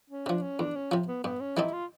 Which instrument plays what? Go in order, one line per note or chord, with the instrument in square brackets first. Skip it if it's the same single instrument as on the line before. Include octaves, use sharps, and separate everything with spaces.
[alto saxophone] C#4
[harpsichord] C3 F3 [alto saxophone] D4
[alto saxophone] C#4
[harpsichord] E2 [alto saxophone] D4
[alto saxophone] C#4
[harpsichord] C3 F3
[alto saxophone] B3
[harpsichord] G2 [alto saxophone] B3
[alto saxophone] C#4
[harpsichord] E3 G3 C4 D#4 [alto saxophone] E4
[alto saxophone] F4